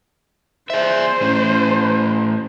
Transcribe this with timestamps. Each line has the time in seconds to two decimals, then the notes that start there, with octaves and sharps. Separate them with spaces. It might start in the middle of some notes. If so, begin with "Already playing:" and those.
0.70 G#4 C5 E5
1.21 A2 C#4